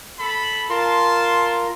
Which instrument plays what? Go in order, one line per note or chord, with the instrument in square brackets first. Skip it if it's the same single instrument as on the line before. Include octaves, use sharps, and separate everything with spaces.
[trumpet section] A4 B5
[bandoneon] F4 A#4 [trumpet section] A5 C6